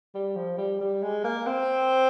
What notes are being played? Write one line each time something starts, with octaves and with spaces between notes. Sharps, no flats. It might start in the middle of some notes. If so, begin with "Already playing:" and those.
G3
F3
G3
G3
G#3
A#3
C4